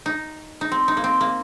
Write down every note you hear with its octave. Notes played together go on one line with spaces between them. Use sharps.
D#4
D#4
C4
D#4
A#3
C4
A#3